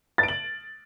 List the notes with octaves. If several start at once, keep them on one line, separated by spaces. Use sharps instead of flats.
A6
D7
F#7